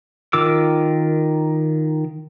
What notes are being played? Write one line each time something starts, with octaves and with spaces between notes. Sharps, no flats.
D#3 F4 A#4 D6 E6